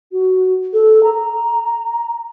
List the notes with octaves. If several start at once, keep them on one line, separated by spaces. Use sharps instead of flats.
F#4
A4
A#5